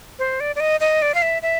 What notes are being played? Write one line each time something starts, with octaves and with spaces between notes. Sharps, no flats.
C5
D5
D5
D#5
D#5
D5
F5
E5
E5